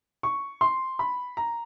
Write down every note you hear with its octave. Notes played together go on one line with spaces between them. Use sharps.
C#6
C6
B5
A#5